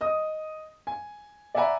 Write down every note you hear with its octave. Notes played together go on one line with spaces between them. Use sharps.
D#5 D#6
G#5
D5 E5 F#5 G#5 A#5 B5